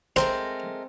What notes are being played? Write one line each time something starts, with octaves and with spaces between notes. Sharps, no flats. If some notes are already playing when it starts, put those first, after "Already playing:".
G#3 A3 C4 A#4 C5